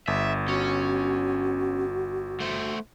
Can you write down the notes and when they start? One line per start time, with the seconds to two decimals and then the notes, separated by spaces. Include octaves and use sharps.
0.08 G1 E5
0.48 C#4 F#4
2.40 A3 C5